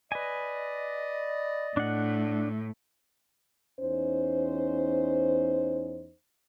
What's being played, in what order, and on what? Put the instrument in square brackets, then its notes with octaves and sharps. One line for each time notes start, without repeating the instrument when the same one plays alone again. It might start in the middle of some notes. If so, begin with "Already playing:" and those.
[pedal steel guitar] B4 G#5 [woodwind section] D5 D#5
[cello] A2 [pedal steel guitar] D4 F#5
[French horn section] E2 C#4 D#4 C5